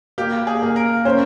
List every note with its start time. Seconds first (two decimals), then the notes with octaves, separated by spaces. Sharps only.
0.18 A#3 G4
0.47 G#4
0.62 A#3
0.76 A#4
1.05 C#4 C5